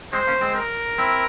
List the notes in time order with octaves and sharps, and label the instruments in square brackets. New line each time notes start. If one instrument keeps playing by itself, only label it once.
[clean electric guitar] G#3 C4 [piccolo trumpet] C5
[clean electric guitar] A#3 C#4
G#3 C4
[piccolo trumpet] A#4
[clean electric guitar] C4 E4